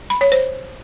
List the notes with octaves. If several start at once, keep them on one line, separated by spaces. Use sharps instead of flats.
B5
C#5
C5